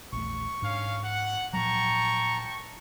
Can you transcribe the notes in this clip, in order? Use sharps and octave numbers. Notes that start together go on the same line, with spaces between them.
A#1 E2 A3 C#6
G#2 C#4 D4 C#5 F5
F#5
A#2 F3 F#3 G5 A5 A#5 C#6